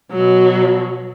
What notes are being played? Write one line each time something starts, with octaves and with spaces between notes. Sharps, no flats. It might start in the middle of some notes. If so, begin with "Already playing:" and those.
B2 F#3